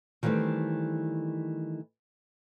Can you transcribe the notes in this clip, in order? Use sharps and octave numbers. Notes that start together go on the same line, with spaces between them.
D#3 E3 G3 A3 C4